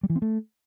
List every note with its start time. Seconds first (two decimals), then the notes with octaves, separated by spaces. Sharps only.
0.03 G3
0.10 E3
0.16 C4
0.22 A3